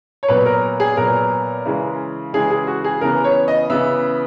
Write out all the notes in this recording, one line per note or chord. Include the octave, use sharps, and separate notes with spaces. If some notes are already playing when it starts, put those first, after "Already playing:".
C#5
A#2 F#3 B3 B4
A#4
G#4
A#2 F#3 B3 A#4
C#3 E3 G#3
C#3 E3 G#3 G#4
G#4
F#4
G#4
C#3 E3 B3 A#4
C#5
D#5
C#3 E3 B3 E5